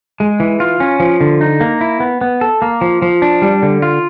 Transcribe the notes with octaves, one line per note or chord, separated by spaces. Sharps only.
G#3
E3
F4
C#4
F3
D3
D#4
A#3
E4
B3
B3
A4
A#3
F3
F3
D4
G3
D3
F4